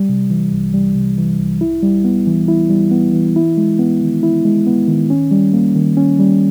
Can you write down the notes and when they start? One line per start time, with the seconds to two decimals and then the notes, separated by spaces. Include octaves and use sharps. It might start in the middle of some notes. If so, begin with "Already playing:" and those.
Already playing: G3
0.09 C3
0.30 E3
0.52 C2
0.74 G3
0.95 C3
1.18 E3
1.39 C2
1.61 E4
1.82 G3
2.05 B3
2.27 E3
2.48 E4
2.70 G3
2.91 B3
3.14 E3
3.36 E4
3.57 G#3
3.79 B3
4.01 D#3
4.23 E4
4.45 G#3
4.67 B3
4.88 D#3
5.10 C#4
5.31 G3
5.53 A#3
5.75 D#3
5.97 C#4
6.19 G3